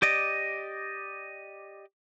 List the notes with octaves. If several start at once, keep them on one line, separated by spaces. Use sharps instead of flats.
G4 D5 D#5